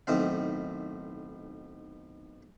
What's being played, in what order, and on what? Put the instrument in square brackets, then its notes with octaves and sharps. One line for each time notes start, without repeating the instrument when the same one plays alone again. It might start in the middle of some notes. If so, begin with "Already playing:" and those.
[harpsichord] B1 A2 D#3 C4 F5